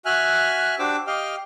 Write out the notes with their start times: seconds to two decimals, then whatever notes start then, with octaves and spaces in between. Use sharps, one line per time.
0.06 F#4 E5 G#5 F6 F#6
0.79 D4 F#4 G4 C5 D6 E6
1.07 G4 D#5 F5 G5 F6